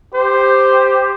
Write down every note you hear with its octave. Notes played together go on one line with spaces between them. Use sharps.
G4 C5